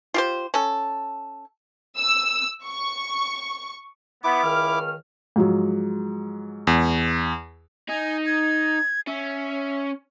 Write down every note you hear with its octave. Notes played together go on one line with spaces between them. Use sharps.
F4 G4 C5
C#4 A4
E6
C#6
B3 E4 D6
C#2 D#3 F6
G#2 F3 F#3
E2
D#4 G#5
G#6
C#4 E5